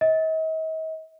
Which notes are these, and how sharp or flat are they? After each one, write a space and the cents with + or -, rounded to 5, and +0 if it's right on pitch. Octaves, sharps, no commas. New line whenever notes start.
D#5 +45